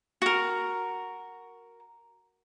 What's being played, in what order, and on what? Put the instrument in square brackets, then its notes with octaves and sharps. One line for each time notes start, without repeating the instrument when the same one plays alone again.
[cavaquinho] F#4 A#4